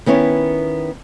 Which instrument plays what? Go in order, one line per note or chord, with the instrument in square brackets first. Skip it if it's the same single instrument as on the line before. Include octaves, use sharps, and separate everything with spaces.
[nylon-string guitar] D#3 B3 C#4 E4 C#5